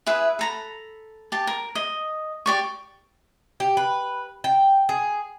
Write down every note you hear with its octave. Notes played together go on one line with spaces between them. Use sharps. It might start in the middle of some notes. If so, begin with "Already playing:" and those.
E4 G#4 B4 E5
A4 A#5 B5
G4 A5
A#4
D#5
G4 D5 C#6
G4
B4
G5
G#4